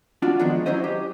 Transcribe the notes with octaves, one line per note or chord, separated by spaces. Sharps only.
D4 F4 F#4
D#3 F3 G#3 B3 D4
F#3 C#4 E4 C5 D#5
G4